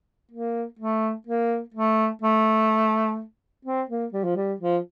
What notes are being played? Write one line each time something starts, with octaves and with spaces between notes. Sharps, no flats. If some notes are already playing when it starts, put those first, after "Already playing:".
A#3
A3
A#3
A3
A3
C4
A#3
G3
F3
G3
F3